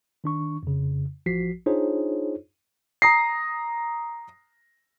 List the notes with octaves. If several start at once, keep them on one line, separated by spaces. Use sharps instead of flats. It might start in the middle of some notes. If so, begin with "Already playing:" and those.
D#3 D4 C#6
F2 C#3
A1 F3 F#4 B6 C7
D4 D#4 F4 G#4 C5 C#5
A#5 D#6 A#6 C7